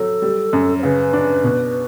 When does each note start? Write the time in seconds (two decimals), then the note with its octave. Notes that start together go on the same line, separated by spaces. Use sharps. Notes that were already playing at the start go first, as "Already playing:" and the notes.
Already playing: F#3 A4
0.22 G3
0.53 F#2
0.79 C#5
0.83 C#3 B4
1.13 D4
1.44 B2